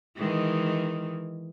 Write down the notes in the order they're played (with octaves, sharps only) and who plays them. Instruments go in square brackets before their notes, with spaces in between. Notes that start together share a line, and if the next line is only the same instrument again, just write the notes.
[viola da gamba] D#3 E3 G#3